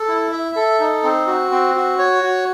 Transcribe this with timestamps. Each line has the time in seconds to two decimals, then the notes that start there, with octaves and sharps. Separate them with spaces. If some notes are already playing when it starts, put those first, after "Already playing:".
Already playing: A4
0.08 E4
0.32 E5
0.56 A4
0.80 D#4
1.03 C4
1.27 F#4
1.51 C4
1.75 F#4
1.98 C#5
2.23 F#4